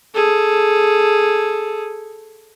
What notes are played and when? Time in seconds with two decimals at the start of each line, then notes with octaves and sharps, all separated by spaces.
0.14 G#4 A4